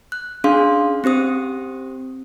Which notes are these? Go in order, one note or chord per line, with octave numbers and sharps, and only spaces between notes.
F#6
C#4 D4 G#4 F5 C6
C4 G4 C5 D#6